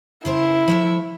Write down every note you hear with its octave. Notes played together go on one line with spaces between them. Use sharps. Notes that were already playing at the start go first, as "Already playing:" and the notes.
C#3 E4 A#4 C5
F3 A3 E5